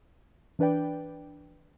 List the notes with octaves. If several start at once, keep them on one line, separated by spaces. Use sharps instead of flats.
E3 D4 B4 D5 G5